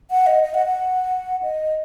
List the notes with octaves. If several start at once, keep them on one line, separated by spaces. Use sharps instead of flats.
F#5
D#5
D#5
F#5
F#5
D#5